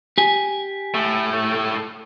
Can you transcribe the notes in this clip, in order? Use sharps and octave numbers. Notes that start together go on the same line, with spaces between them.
G4 G#5
A2 A3